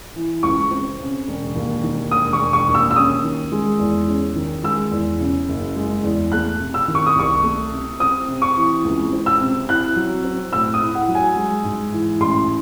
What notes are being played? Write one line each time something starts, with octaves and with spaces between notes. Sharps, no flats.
E3
C#2 C#6
C4
C#3
E1
D#2
D#3
E1 D#6
C#6
E1
C#6
D#2
E6
E6
C#4 D#6
D#3
G#3
E2
C#4
D#3
G#3 E6
E2
C#3
F#1
G#3
E2
A3 F#6
C3
E6
D#3
C#6
D#6
C2 C#6
A3
C3
C4 D#6
C3
C#6
E3
C#2
C4
E6
C3
E4 F#6
F#3
C4
A2 E6
D#6
E4
F#5
F#3
G#5
G#3
G#2
E3
A1 C6